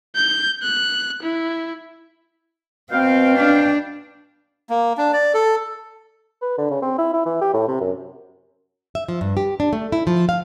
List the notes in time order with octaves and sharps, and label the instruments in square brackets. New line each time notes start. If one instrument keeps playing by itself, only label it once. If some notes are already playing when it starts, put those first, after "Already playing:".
[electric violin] G6
F#6
E4
[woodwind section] B2 F5 G5 [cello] C4
[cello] D4
[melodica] A#3
D4
D5
A4
[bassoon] B4
D3
C#3
C4
E4
E4
E3
G4
A2
C3
F#2
[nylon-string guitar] E5
F3
G2
G4
D4
A3
E4
F3
F5